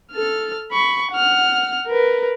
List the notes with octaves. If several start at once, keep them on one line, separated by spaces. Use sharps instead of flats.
A4 F6
B5 C#6
F#5 F6
A#4 B4